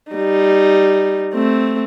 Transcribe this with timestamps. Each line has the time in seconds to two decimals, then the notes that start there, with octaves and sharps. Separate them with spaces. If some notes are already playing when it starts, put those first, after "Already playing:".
0.12 G3 D#4
1.34 A3 C4